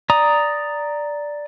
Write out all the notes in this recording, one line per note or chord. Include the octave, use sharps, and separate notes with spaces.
D5 A#5 D#6